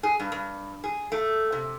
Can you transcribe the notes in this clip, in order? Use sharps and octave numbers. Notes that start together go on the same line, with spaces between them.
G#4
G2
G2
G#4
A3
C3